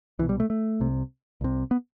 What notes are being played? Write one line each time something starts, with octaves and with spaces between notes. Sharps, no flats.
C2 B2 E3
G3
A3
A3
C2 C3
C2 C3
B3